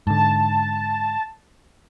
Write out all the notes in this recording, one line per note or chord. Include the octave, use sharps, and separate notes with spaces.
G#2 D3 A5